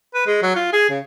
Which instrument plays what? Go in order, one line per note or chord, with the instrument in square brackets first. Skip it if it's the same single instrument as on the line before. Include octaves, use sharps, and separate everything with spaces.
[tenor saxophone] B4
G#3
F#3
F4
G#4
C#3